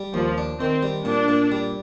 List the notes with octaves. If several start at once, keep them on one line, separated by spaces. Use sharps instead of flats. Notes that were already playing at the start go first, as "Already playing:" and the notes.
Already playing: G3
D#2 F3
D4
D#3 C4
G3
A#2 D4
A#2
G3